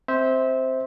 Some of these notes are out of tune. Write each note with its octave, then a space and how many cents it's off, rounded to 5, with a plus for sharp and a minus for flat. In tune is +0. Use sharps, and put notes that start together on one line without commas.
C4 +0 C5 +0 E5 -25